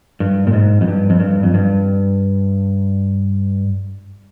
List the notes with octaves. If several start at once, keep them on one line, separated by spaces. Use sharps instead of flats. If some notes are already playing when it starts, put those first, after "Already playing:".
G2
A#2
G#2
F2
G2
F2
G2
F2
G2